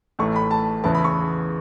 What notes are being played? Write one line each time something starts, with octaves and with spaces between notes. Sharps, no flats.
A1 A2 E3 A3 C#6
B5
A5
E2 C#3 E3 B3 E4 A5
B5
C#6